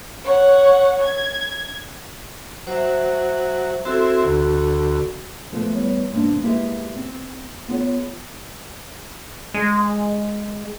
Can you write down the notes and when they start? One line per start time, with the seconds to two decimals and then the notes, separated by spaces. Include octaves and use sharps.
0.24 C#5 F#5
1.01 G#6
2.67 F#3 C5 E5
3.85 C4 E4 F#4 A4
4.25 D2
5.51 A2 F3 A3 B3
5.75 E2 G3 B3 E4 B4 C#5
6.11 E2 G#2 C3 A#3 D4
6.43 G#3 A#3 E4 G4 G#4 B4
6.96 C4
7.68 B3 F4 G#4 C#5 F#5
9.54 G#3